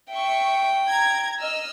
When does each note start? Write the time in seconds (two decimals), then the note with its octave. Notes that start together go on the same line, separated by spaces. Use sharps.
0.12 E5 G5 C#6
0.86 A#5 G#6
1.39 D#5 E6 F6